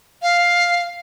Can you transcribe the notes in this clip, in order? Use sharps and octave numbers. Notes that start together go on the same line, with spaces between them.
F5